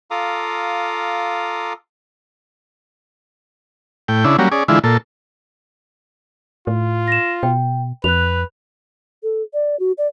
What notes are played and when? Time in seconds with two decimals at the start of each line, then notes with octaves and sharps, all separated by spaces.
0.11 F4 A4 F5 A#5 D6 D#6
4.08 A2 G5
4.25 C#3 D4 E4
4.39 F#3 G3 A#3 C#4
4.52 C#4 G#4 D5
4.68 D3 E3 G#3 E4 F4
4.84 A#2 A4
6.67 A2 F4
7.08 A#6 E7
7.43 B2 G5
8.04 F2 B4 F#6 F7
9.23 A4
9.54 D5
9.80 F#4
9.98 D5